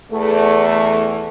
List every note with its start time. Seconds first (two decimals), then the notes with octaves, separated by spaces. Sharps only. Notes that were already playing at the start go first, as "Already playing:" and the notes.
0.12 E2 A3